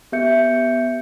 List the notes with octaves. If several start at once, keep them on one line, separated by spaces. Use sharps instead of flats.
B3 G4 E5 G6 C#7